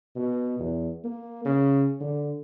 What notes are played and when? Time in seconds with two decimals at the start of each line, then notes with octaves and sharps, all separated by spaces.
0.15 B2
0.59 E2
1.04 A#3
1.45 C#3
2.00 D3